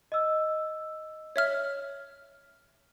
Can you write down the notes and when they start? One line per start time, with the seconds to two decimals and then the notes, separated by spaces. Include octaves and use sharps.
0.12 D#5 E6
1.36 C#5 E5 F6